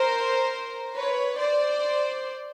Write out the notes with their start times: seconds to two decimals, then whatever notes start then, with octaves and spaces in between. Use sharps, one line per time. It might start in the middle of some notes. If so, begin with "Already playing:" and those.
Already playing: A#4 C5
0.95 B4 C#5
1.38 C5 D5